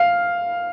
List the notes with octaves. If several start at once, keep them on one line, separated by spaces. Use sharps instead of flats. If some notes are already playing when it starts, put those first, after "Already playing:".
Already playing: F5